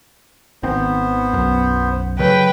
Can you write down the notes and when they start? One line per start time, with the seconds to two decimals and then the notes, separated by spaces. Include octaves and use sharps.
0.63 G#1 D#3 B3 C4 C5
1.33 B1 F#2
2.19 C#3 F#3 A3 B4 G5